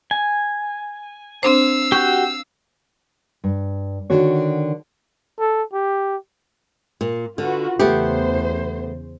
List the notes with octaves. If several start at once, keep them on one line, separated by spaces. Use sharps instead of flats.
G#5
C4 D4 C5 F5 E6
F#4 G4 C#6 G6
G2
D3 D#3 F#4 C#5
A4
G4
A#2
D3 F4 F#4 B4
E2 C#3 A3 B3 G4 C5